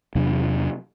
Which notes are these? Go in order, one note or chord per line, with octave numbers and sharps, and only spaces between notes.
E2 C3 F#3 D4